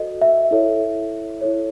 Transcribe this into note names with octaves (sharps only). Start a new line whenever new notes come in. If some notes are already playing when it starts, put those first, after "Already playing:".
Already playing: F#4 A4 C5 D#5
E5
E4 A4 C#5
E4 A4 C#5